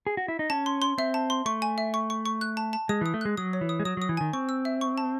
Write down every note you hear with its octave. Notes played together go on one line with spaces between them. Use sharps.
G#4
F#4
E4
D#4
C#4 A5
C6
C6
C4 E5
A5
C6
A3 C#6
G#5
E5
C#6
C#6
C#6
F#6
A5
A5
G#3 D#6
E3 D#6
A3
G#3 F#6
F#3 D#6
C#5
E3
D#6
G#3
F#3 D#6
F#3 D#6
E3
D#3 G#5
C4 C#6
E6
E5
C#6
A5